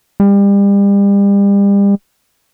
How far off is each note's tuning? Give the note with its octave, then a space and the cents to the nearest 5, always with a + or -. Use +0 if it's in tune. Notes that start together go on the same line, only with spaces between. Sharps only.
G3 +35